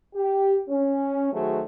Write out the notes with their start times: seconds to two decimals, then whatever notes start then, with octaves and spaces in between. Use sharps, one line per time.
0.16 G4
0.69 C#4
1.32 D#3 F#3 A3 F#4 G#4 C5